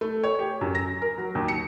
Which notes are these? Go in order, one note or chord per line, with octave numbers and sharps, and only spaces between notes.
A3
C#5
G4
F#2
A#6
A#4
F#3
D#2
C#7